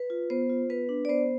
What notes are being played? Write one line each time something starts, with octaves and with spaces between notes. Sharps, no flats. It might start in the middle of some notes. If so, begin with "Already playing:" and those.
Already playing: B4
F4
B3 C5
F4
B3 B4
D4
D5
B3 C5